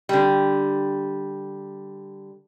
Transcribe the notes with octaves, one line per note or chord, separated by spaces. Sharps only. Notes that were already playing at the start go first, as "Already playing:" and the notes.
D3 G3